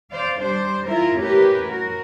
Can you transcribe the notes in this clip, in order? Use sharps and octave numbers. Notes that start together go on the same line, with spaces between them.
C5 D5 F5
G3 D4 C5
E4 F4 A#4 E5
A2 C#4 G4 A#4 B4
F#4 A#4